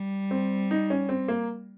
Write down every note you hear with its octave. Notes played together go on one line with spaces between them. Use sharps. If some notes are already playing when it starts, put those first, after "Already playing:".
Already playing: G3
C4
D#4
C#4
C4
A#3